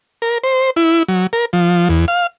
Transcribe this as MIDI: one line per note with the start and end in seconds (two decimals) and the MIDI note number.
0.22 0.38 70
0.44 0.70 72
0.76 1.03 64
1.09 1.27 54
1.33 1.45 70
1.53 1.88 53
1.89 2.06 40
2.08 2.27 77